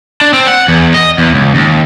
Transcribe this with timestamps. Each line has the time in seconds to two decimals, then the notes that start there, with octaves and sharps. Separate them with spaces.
0.21 D4
0.34 C4
0.47 F#5
0.68 E2
0.94 D#5
1.18 E2
1.34 C#2
1.55 D#2